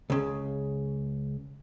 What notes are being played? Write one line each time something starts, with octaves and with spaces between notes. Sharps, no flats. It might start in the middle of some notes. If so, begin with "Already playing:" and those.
C#2 C#3